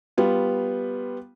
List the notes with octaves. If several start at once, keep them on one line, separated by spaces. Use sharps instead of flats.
G3 B3 F4